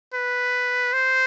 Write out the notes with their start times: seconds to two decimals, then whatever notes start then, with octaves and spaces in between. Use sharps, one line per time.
0.13 B4
0.93 C5